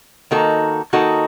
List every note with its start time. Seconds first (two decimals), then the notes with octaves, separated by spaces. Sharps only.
0.31 D#3 A#3 D#4 F#4 A4
0.93 D#3 A#3 D#4 F#4 A4